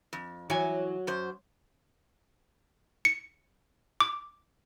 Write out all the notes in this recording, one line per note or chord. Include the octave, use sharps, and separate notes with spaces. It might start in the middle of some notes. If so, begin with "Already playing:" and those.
F2
E3 F#3 G#5
F#2 C5
C#7
D6